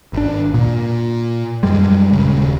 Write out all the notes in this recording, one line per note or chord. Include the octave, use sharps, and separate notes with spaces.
G#1 D4
A#2
F#2 G3 G#3
D#1 C#3